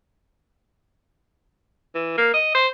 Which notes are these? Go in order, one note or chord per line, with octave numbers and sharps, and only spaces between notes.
E3
A#3
D#5
C5